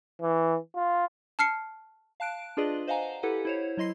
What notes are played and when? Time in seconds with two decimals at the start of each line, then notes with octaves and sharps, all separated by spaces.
0.22 E3
0.76 F4
1.39 A5 F6 C7 C#7
2.20 F5 A5 F#6 D7
2.57 D4 F4 G#4 B4 D5 D#5
2.87 C5 D#5 F5 F#5 G#5 A#5
3.23 E4 G4 A4 B4 F#5
3.45 E4 C5 C#5
3.77 F#3 E4 D#5 C6 C7